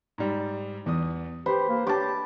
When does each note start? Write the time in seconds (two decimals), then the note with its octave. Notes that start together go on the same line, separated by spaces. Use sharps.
0.18 G#2 G3
0.86 E2 E3 D#6
1.46 G4 B4 C5
1.69 A#3
1.87 G4 A5 D6